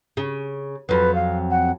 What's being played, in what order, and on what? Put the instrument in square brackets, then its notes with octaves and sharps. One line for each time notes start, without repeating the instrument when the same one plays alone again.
[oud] C#3
[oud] F2 F#3 [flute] B4
[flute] F5
F#5